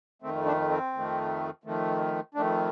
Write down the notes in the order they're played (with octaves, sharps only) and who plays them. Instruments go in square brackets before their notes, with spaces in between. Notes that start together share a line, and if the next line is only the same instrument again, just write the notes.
[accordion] F2 D#3 A3 C4
D4
C4
F2 D#3 A3
F2 D#3 A3
F2 D#3 A3 D4